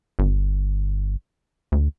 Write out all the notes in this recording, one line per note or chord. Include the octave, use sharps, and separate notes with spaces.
G1
D2